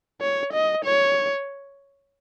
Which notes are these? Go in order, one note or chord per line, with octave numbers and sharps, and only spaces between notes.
C#5
D#5
C#5